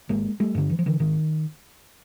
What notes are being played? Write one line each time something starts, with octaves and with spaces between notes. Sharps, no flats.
G#1 G#3 A#3
G3 A3
G2 D3
E3
F3
D3 E3
G#1 D#3